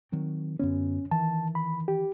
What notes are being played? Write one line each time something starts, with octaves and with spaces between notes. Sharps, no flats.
D#3 F#3 C4
F#2 D3 B3 C#4
D#3 E3 A5
B5
G4